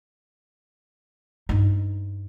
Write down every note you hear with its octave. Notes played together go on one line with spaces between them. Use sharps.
G2 D#4